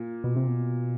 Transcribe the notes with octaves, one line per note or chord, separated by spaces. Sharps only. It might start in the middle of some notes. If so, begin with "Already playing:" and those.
Already playing: A#2
B2
C3
B2